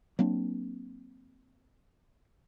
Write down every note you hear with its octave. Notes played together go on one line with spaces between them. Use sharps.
F#3 A#3 C4 D4